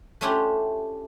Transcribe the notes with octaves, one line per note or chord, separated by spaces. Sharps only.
A3 C#4 D4 E4 F4 G4